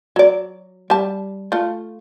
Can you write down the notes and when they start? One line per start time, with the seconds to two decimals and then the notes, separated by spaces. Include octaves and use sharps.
0.16 F#3 D5
0.90 G3 A5
1.52 A3 F4